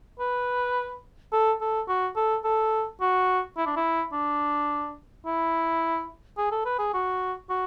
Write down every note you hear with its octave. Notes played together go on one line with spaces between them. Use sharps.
B4
A4
A4
F#4
A4
A4
F#4
E4
D4
E4
D4
E4
G#4
A4
B4
G#4
F#4
F#4